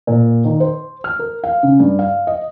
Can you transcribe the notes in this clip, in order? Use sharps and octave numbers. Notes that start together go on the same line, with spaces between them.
A#2
D#3
C5
F6
A#4
F5
C#3
G2
F5
D#5